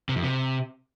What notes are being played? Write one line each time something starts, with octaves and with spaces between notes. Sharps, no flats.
C3
F2
C3